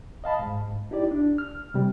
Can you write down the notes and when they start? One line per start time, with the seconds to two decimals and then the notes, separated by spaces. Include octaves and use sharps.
0.24 D#5 F5 A5 B5
0.39 G#2
0.91 D#4 E4 G4 D5
1.11 D4
1.38 F6
1.74 C3 G3